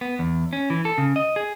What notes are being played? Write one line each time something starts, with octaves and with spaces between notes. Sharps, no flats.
B3
E2
C#4
E3
A4
C#3
D#5
G#4